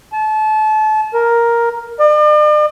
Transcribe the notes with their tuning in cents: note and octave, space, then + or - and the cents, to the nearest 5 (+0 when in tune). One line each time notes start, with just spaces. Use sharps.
A5 -30
A#4 +5
D5 +45